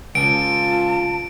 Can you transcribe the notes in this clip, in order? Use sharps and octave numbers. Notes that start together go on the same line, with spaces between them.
C#2 F4 A5 D7